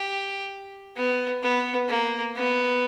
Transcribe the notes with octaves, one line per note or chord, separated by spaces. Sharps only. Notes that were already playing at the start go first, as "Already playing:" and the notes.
Already playing: G4
B3
B3
A#3
B3